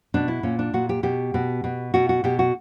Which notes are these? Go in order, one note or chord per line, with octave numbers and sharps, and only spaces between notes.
B2 D4
E4
A#2 C#4
D4
A#2 F#4
G4
B2 G4
B2
B2
B2 F#4
F#4
B2 G4
F#4